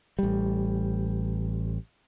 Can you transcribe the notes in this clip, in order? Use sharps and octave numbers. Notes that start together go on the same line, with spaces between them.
A1 G3